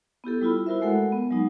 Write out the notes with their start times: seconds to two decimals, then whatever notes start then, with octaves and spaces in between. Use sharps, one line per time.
0.24 B3 E4 G4 A4
0.41 G3 E4 F4 B5
0.66 E4 F#4 A#4 C5 E5
0.82 G#3 A3 F#4 A4 A#4 F#5
1.12 B3
1.31 F#3 G#3 D#4